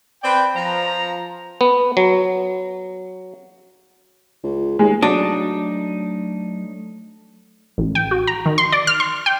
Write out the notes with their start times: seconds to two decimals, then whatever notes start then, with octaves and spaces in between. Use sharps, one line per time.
0.23 C4 B4 D5 G5
0.55 F3 A#5
1.61 B3
1.97 F#3
4.43 C#2
4.79 D#2 G#3
5.02 F#3 A3 D4 D#4 D#5
7.78 A1
7.95 G5
8.11 F#4
8.27 A#5
8.46 D#3
8.58 C6
8.72 D5
8.87 F6
9.00 C6
9.26 G5